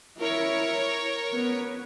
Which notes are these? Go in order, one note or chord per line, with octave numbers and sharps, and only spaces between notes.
E4 A#4 C#5
B3